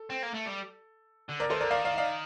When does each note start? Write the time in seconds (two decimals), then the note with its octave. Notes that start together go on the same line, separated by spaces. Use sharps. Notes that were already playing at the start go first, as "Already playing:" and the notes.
Already playing: A4
0.10 C4
0.23 A#3
0.34 A3
0.46 G3
1.29 D3
1.40 A#4 D5
1.50 D#3 A4 C5
1.61 D3 A#4 D5
1.71 D#3 D5 F5
1.85 D5 F5
1.93 D#5
1.98 D5 F5